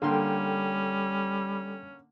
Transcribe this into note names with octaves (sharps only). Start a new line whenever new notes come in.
D3 G3 A#3 C#4 A4 G5 C6